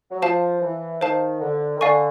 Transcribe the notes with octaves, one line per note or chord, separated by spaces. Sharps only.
F#3
F3 C5 F5 A5
E3
D#3 C5 F5 A5
D3
D#3
D3 D5 F5 G#5 C#6